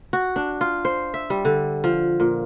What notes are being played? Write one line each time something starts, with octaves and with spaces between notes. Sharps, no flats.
F#4
D4
F4
C5
E5
G3
D3
F3
A#2